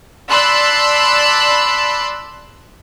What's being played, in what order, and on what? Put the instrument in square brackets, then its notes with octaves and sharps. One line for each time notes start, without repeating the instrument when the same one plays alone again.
[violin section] D5 A5 B5 C6 E6 F#6